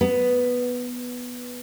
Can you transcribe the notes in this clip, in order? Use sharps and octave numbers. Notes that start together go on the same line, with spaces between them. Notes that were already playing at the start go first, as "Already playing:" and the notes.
B3